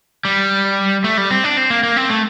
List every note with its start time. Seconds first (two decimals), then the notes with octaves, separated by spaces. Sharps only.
0.25 G3
1.04 A3
1.18 G3
1.31 C4
1.44 D4
1.57 C4
1.70 A#3
1.83 A#3
1.97 C4
2.10 A3